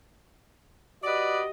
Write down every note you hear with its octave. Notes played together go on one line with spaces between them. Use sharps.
F#4 G4 B4 D5 D#5